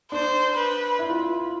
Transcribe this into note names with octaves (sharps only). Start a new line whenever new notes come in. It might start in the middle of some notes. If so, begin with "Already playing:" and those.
D4 C5
B4
E4
F4